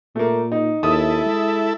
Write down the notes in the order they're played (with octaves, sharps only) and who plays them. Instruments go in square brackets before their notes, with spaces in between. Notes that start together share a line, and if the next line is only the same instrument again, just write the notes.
[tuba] A#2 [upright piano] A3 A#3
[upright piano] D#4
[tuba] D#2 [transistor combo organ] E4 A4 [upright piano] D#6
[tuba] G#3